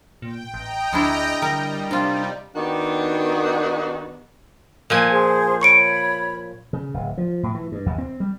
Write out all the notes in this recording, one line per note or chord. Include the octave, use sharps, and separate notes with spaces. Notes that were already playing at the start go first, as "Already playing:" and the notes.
A#2 G5
A1 D#5 G5 A#5
D2 G#3 D4 E4
D3 G3 A#4
C3 G3 D4 D#4 F4
D#3 B3 D4 D#4 F#4 G4
A#2 F3 G#5
G#4 C5
C#5 B5 C#6 C#7 D7
C#3
D1
F3
A2
E3
G2
D#2
C4
G3